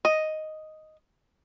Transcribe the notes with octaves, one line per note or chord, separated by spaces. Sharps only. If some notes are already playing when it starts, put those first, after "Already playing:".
D#5